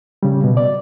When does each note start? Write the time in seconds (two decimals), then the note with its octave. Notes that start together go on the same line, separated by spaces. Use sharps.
0.23 C#3 G3
0.44 B2
0.57 D5